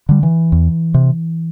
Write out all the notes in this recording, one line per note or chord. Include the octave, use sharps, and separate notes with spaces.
D3 G3
E3
E2
C3